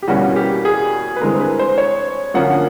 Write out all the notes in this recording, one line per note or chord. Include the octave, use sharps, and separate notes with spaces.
G4
E2 B2 G3 A#3 C#4 F#4
G4
G#4
B4
G2 E3 G#3 C4 A#4
B4
C5
C#5
F#2 D3 F3 A#3 C#4 F#5